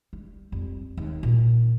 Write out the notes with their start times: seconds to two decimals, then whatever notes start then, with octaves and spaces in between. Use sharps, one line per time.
0.13 G3
0.52 F2 G3
0.97 D#2
1.23 A#2